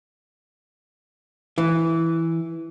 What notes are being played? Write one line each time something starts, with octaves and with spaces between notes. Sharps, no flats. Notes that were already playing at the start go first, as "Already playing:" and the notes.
E3